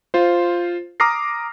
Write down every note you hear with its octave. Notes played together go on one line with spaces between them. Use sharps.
F4 C5
A#5 D6 D#6 F6 A#6 C7